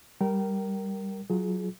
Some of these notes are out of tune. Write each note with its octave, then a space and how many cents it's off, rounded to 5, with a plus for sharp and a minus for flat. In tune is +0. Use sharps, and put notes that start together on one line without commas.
G3 +0 A#4 +0 G5 -30
F#3 +0 F4 +0 G#4 +25